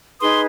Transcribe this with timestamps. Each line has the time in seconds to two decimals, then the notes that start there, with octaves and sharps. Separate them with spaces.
0.20 D#4 G#4 B4 C6 D#6